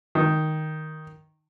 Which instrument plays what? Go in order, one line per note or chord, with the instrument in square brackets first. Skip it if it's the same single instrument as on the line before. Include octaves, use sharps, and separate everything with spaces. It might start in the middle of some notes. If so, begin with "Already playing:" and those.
[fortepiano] D#3